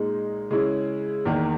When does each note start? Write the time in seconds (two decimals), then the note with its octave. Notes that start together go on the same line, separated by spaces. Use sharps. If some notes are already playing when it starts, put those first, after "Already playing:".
Already playing: A#2 G#3 D#4
0.51 C#3 G#3 C#4 E4
1.25 E2 D#3 A#3